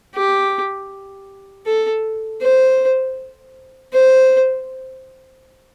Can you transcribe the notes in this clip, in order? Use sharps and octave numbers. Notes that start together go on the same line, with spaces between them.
G4
A4
C5
C5